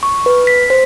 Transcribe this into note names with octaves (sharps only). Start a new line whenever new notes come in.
C#6
B4
B6
C5